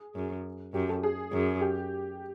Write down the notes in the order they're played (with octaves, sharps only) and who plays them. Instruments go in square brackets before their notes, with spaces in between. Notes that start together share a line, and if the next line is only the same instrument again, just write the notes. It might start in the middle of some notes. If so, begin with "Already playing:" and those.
Already playing: [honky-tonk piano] G#4
[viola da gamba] F#2
[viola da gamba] F#2 [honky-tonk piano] G4
[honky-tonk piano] A4
G#4
[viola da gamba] F#2
[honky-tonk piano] G4